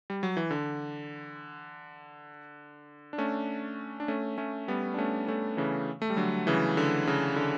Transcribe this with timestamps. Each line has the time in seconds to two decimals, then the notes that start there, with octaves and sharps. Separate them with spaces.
0.10 G3
0.23 F#3
0.37 E3
0.51 D3
3.13 D4
3.18 A3 C#4
4.00 D4
4.08 A3 C#4
4.38 A3 C#4
4.68 G3 B3
4.94 D4
4.98 A3 C#4
5.27 A3 C#4
5.57 C#3 E3
6.02 A3
6.10 G3
6.17 D3 F#3
6.47 C#3 E3
6.77 D3
7.07 C#3
7.36 D3